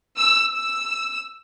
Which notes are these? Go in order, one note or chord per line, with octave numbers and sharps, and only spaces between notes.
E6
E6